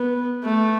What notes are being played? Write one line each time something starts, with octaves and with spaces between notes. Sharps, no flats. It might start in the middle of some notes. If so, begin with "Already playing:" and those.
Already playing: B3
A3